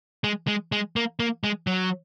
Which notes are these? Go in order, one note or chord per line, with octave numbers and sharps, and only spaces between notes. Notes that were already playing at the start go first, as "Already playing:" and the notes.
G#3
G#3
G#3
A#3
A#3
G#3
F#3